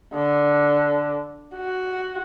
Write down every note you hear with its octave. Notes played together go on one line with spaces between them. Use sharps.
D3
F#4